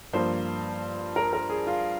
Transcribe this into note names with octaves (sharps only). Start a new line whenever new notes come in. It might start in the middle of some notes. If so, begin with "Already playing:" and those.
G2 F3 A#3 C5
A#4
A#4
G#4
F4